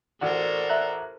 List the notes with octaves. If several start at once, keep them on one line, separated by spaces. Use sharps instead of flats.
A1 F#4 A4 A#4 C5 D5
E5 A#5 F#6